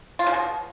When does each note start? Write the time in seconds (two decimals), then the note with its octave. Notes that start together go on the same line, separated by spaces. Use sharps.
0.19 F4
0.27 C#3
0.34 B2